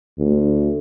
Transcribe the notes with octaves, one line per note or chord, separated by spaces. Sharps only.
D2